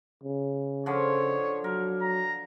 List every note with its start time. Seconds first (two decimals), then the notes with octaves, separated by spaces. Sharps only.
0.23 C#3
0.86 D3 F3 C#5
1.64 F#3 A#4
2.01 A#5